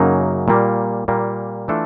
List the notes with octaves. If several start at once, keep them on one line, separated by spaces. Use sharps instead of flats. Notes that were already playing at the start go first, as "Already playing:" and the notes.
Already playing: F#2 C#3 F#3 A#3 D#4
A#2 G3 A#3
A#2 G3 A#3
E3 A3 D4 F4 A4